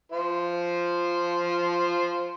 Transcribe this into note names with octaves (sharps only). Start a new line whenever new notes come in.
F4 C5